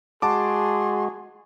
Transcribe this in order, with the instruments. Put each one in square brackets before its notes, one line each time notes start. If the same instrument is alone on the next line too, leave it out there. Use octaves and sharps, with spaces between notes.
[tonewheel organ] G#3 F#4 [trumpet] G#4 [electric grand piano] F#5 A5 D6 [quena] C6